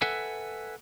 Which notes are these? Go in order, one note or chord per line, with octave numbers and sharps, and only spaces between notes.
A4 B4 E5 F#5 G#5